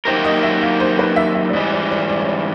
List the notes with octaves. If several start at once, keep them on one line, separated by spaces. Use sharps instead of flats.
F#3 A#3 D#4 G4 A#4 C5
D#5
E5
F5
C5
B4
E5
E5
D5
G#2 E3 G3 D#5
D5
D5
D5
C#5
D5